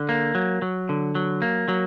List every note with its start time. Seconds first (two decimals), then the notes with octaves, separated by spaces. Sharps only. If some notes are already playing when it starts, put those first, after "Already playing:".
Already playing: D3
0.09 A#3
0.35 F#3
0.62 F#3
0.89 D3
1.15 F#3
1.42 A#3
1.68 F#3